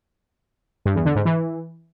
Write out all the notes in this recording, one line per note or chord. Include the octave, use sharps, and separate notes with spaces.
G2
E2
D3
G#2
E3